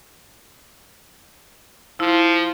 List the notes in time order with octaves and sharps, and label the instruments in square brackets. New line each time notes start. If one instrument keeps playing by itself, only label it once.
[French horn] F3 [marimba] E4